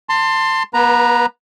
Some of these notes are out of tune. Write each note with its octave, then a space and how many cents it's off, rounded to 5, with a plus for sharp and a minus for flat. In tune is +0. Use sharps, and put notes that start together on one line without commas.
A5 +30 C6 +0
B3 -45 B4 -10 A#5 +0